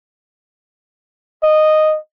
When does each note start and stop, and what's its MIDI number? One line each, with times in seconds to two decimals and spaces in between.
1.43 1.98 75